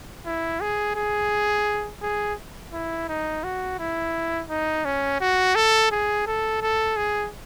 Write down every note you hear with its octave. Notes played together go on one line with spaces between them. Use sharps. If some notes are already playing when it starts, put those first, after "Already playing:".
E4
G#4
G#4
G#4
E4
D#4
F#4
E4
D#4
C#4
F#4
A4
G#4
A4
A4
G#4